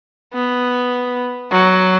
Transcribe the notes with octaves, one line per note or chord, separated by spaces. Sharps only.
B3
F#3